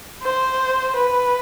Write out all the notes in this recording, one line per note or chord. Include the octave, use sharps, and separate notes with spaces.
C5
B4